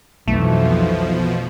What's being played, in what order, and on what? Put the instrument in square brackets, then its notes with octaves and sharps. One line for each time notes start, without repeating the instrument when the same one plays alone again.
[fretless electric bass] B1 [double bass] F2 E3 [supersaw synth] B2 F3 [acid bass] A3